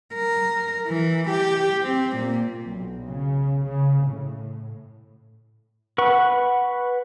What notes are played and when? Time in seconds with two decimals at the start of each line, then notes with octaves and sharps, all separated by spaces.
0.15 A#4
0.88 E3
1.30 G4
1.82 C4
2.16 A#2
2.67 B1
3.09 C#3
3.66 C#3
4.07 A2
5.98 B4 F#5 C#6